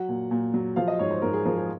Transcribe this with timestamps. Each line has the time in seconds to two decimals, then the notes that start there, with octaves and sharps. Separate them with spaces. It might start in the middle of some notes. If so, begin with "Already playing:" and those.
Already playing: F#3 F#5
0.09 A#2
0.31 A#2
0.54 F#3
0.76 F3 F5
0.88 D#5
0.99 G#2 C#5
1.11 C5
1.22 G#2 A#4
1.33 G#4
1.45 F3 A#4
1.57 G#4